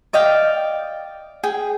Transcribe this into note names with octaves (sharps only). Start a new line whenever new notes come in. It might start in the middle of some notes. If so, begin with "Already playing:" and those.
D5 D#5 F5 G5
G#4 G5